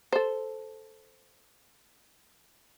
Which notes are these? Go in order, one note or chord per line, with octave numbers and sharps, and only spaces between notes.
A4 C5